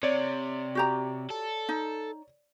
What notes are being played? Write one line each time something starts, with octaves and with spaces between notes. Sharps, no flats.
C3 C#5 D5
F#4 G4 A#5
A4
D#4